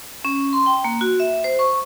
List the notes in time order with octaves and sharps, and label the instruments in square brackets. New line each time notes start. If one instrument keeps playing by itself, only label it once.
[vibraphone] C#4
C6
G5
A#3
F#4
E5
C5
C#6